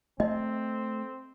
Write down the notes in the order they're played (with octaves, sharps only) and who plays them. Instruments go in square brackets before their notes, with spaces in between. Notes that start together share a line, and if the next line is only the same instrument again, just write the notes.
[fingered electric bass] A3 [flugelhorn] C4 [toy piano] D#5